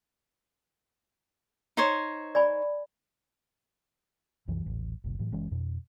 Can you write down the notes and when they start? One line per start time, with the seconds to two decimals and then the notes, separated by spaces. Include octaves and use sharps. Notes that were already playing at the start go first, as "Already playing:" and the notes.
1.77 D#4 C5 C#5
2.35 D5 G#5 B5
4.48 C2 F#2 E3 F#3
4.66 D#1 A1
5.04 F#1 C2 A#2
5.19 A2 E3 F#3
5.32 F#1 E3 G#3 C#4
5.51 F2 B2